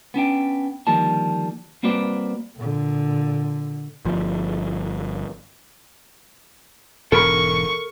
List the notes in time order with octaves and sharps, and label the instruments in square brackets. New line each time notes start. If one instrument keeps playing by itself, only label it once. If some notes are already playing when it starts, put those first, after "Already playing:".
[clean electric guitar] B3 C#4 D4 G5
D3 D#3 F3 G3 A#3 A5
G3 A#3 C4 F#4 B4 D5
[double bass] A#2 D3
[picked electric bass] G1 F3
[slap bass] E1 G#2 [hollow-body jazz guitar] A4 A#4 B5 [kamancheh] C#6